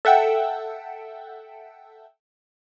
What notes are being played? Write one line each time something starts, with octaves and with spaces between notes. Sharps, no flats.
A4 E5 F#5 G5 E6